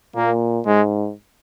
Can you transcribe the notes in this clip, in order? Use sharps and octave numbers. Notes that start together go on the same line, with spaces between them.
A#2 A#3
G#2 G#3